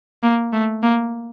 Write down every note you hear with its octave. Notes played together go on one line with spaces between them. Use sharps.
A#3
A3
A#3